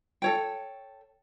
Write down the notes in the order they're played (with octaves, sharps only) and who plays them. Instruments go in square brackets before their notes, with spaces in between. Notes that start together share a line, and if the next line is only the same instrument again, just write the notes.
[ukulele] A4 C#5 G5